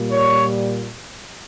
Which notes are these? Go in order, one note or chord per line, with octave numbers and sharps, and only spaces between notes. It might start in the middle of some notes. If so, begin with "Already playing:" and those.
Already playing: A#2 G3
C#5